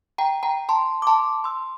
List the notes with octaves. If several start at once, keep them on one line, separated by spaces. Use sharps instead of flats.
G5 A#5
G5 A#5
A5 C6
D6
A5 C6
C6 E6